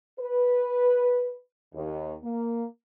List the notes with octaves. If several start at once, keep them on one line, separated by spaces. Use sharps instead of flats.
B4
D#2
A#3